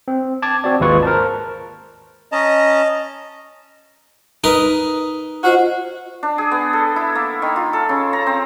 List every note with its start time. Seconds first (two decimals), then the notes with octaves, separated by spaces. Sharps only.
0.08 C4
0.42 A5 D6 G#6
0.64 C4 F#4 D5
0.80 G#1 D#2 G#3 F4 B4 C#6
1.03 A#4 C5 A5
2.32 C#4 D#5 A5 A#5
4.44 D#4 A#4 B4
5.44 F4 F#4 C5 D#5
6.23 D4
6.38 G#4
6.51 B3
6.73 A4
6.96 E4
7.15 A#3
7.42 D#3
7.56 F4
7.73 A4
7.89 C#3
8.13 A#5
8.26 C4